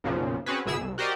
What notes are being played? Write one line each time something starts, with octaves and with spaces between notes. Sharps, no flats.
B1 F#2 A#2 C#3 F3
C4 C#4 F#4 G#4 B4
G1 B2 E4 G#4 E6
C2
F#4 G4 A#4 C5 D5 D#5